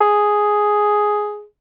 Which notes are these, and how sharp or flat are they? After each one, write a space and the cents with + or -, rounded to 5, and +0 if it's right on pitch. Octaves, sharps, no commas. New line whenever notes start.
G#4 +5